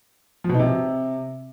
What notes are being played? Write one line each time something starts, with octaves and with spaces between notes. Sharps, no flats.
F3
B2
D#4
C3